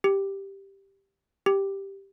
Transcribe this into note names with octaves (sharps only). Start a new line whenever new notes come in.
G4
G4